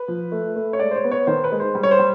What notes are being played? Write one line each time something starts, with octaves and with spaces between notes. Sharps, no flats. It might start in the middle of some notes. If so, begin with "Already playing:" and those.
Already playing: B4
F3
A3
A3
C#5
G#3 D5
C5
C#5
B3
C#5
D#3 C5
B4
G#3
C5
G3
C#5
C5
G3